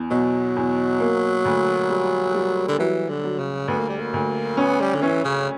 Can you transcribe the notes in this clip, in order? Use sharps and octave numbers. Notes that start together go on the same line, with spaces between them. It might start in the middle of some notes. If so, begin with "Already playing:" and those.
Already playing: E2
B2 F#3
E2
A#3
D2
G3
G3
D3
E3 F#3
D3
F#3
C#3
D2 B3
A#3
G3
A#3
D2
B3 C#4
G3
D3
E3 C#4
C#3